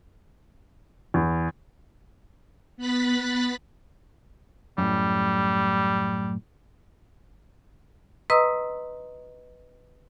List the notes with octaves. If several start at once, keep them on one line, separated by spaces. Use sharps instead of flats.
E2
B3 B5 F#6 A6 B6
F#2 A2 G3
B4 D#5 A#5 C6 D#6 E6